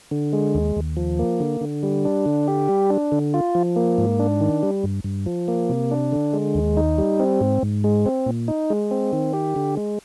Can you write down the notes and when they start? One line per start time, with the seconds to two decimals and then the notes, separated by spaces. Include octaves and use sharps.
0.11 D3
0.33 G#3
0.55 D#2
0.76 D#2
0.97 F3
1.19 A#3
1.40 D3
1.61 D3
1.83 G3
2.05 D4
2.26 D3
2.48 G4
2.69 G3
2.90 D4
3.12 D3
3.34 F4
3.55 F3
3.76 A#3
3.98 G#2
4.19 D4
4.41 D#3
4.63 G3
4.83 G2
5.04 G2
5.26 F3
5.48 A#3
5.70 C3
5.91 D4
6.12 D3
6.33 G#3
6.55 D#2
6.77 D#4
6.98 G3
7.19 C4
7.41 G#2
7.63 G#2
7.84 G#3
8.06 C4
8.26 A#2
8.48 D#4
8.70 G#3
8.91 C4
9.13 D#3
9.33 G4
9.56 D3
9.77 G#3